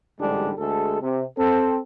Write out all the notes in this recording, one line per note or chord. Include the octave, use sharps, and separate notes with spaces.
A1 G#2 D3 G3 G#3 D4
D2 G#3 G#4 A4
C3
C4 A4